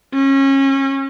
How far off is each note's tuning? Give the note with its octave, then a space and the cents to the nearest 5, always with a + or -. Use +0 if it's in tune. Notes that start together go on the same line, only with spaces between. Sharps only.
C#4 -30